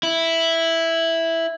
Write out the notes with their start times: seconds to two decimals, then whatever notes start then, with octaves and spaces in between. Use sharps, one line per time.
0.03 E4